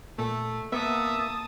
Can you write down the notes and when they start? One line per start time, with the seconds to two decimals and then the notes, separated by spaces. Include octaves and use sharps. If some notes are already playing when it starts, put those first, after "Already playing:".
0.19 A#2 A3
0.72 A#3 B3 E5 F#5 A5 D#6